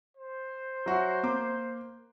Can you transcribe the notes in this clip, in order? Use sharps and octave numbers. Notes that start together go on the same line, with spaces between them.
C5
F#3 F#4 E5
A#3 D6